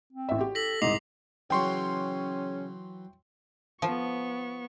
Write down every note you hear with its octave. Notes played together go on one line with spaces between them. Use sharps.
C4
A1 E5
G4
A4 A#6 B6 F#7
C2 G#2 D#5 D6 C7 F7
C#3 E3 F#3 C#4 G5 C6 C#6
F3 B3 C#6